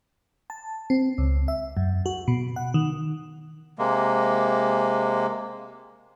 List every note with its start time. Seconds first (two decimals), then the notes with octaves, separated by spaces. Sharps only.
0.50 A5
0.90 C4
1.18 C#2
1.48 E5
1.77 F#2
2.06 F#4
2.28 B2
2.56 F#5
2.74 D#3
3.79 C3 G#3 A#3